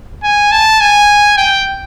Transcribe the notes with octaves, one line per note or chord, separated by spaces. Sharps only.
G#5
A5
G#5
G5